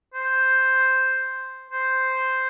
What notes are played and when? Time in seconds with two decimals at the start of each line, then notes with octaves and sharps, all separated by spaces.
0.14 C5
1.70 C5